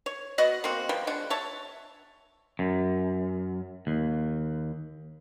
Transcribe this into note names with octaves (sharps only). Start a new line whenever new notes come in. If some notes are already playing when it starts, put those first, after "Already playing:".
C#5
B3 F#4 D#5 F#5
A#3 C4 F#4
F3 G3 A#3 B3
G#3 D4 F#5
C#5 E5 A5
F#2
D#2